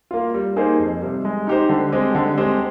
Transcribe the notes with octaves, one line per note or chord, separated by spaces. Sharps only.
A#3 F4
G3
A#3 D#4 G#4 C5
F2
C3 G3
G#3
D#4 G4 C5
D3
G#3 C4 G4
D3
G#3 C4 G4 C5